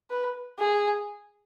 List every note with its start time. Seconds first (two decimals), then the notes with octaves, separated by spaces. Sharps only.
0.10 B4
0.59 G#4